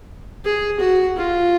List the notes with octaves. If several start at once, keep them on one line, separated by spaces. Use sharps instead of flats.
G#4
F#4
F4